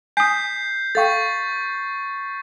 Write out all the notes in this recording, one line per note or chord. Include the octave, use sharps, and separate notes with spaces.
G#5 D#6 G6 B6 C7
A4 F5 G5 C#6 A6